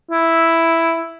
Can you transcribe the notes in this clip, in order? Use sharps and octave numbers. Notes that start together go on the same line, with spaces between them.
E4